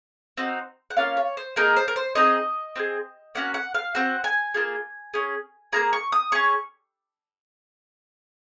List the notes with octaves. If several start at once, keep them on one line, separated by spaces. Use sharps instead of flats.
C4 D#4 F#4
F#5
A#3 C#4 F4 F5
C#5
C5
A#3 D#4 G#4 A#4
C5
A#4
C5
C4 D#4 G#4 D#5
C4 F4 G#4
A#3 C#4 F#4 F#5
F#5
F5
C4 F#4 F#5
G#5
A#3 F4 G#4
C#4 G#4
A#3 F4 G#4 A#5
C#6
D#6
C#4 G#4 C#6